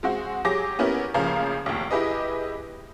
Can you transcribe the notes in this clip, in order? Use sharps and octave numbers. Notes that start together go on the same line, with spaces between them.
G#3 C4 F#4
F#3 G4 G#4 D6 A#6
B3 C#4 E4 G4 A#4
A1 C#3 F3 A#3 F5 A#5
F1 D#2
E4 G4 G#4 B4 D#5